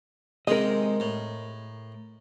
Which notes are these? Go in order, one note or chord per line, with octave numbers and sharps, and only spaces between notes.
C3 D#3 G#3 A#4 D#5
A2